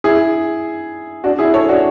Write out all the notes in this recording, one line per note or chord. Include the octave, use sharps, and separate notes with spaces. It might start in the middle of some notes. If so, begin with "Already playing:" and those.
E4 G#4
D4 F#4
E4 G#4
A4 C#5
D4 F#4